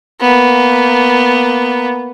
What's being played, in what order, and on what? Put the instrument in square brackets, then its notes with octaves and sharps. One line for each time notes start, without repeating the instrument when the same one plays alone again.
[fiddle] A#3 B3